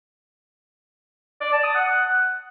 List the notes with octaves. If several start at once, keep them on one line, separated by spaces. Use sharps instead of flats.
D5
A5
D#6
F#5